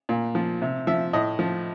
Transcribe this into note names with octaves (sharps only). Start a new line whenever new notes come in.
A#2
F3
C3
F3 E5
A2 D#5
F3